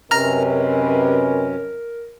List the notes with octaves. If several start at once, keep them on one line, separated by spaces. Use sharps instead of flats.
F#2 C3 C#4 A#4 B4 D#5 A#5 F6